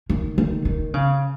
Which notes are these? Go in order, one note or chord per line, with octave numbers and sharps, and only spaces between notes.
D#3
D#3
D#3
C#3